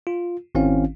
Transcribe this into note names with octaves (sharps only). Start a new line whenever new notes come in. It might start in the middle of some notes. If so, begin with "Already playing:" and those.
F4
G#1 D#3 C4 C#4 E4 F5